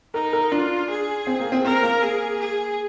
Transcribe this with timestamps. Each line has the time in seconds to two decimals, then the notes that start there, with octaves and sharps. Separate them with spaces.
0.14 D#4 A#4
0.33 A#4
0.51 D4 F4
0.89 G#4
1.27 C4
1.40 A#3
1.52 C4
1.65 C4 A#4
1.83 A#3
2.02 G#4
2.40 G#4